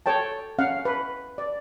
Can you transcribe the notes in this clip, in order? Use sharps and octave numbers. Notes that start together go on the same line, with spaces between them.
A4 C#5 G5 A5
C#4 F5 F#5
B4
D5